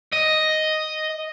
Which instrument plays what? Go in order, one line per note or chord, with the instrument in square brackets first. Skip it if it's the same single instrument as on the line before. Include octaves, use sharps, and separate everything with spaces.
[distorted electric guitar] D#5